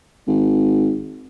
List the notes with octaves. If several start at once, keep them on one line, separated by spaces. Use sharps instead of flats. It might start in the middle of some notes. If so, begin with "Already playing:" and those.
G#1